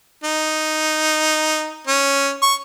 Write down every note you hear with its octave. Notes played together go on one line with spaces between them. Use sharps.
D#4
C#4
C#6